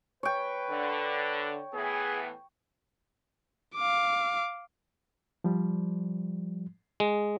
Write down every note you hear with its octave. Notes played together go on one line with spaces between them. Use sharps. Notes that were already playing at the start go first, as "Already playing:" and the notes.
B4 C#5 G5
D3
A2 E3 B3 G#4
F5 D6
F3 G3
G#3